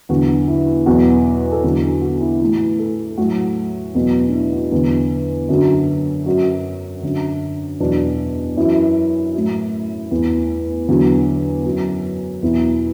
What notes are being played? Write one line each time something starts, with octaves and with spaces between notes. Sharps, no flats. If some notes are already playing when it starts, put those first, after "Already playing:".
E2 D3 F#3 F#4
E4
E2 B2 F#3 F#4
A4
E2 D3 F#3 F#4
F#4
F#4
E4
A2 E3 E4
A4
A2 F#3 F#4
E2 B2 F#3
D4
E4
F#4
E2 D3 F#3
F#2 D3 F#3
F#2 F#3 F#4
F#2 D3 F#3
E2 B2 F#3 D4
F#2 E3 E4
A2 F#3
E2 E3
E2 D3 F#3
F#3
F#2
E2 B2 F#3 E4